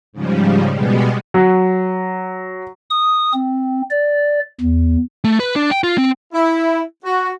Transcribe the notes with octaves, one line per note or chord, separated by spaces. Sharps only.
G#2 C#3 F3 G3
B2 G3 G#3 B3
F#3
D#6
C4
D5
E2
A3
B4
D4
G5
F4
C4
E4
F#4